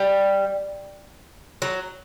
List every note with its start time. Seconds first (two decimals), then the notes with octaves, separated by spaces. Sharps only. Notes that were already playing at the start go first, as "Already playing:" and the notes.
Already playing: G3
1.62 F#3